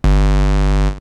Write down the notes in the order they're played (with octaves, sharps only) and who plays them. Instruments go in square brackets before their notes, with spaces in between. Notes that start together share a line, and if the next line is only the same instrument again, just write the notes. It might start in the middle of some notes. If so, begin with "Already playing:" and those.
[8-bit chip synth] G1